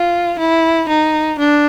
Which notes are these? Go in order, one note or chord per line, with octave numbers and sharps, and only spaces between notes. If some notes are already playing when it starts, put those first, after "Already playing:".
Already playing: F4
E4
D#4
D4